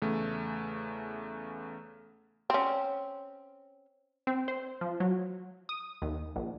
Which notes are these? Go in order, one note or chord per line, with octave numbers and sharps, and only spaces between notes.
E2 C#3 A3
C4 C#4
C4
C5
F3
F#3
D#6
D#2
A#1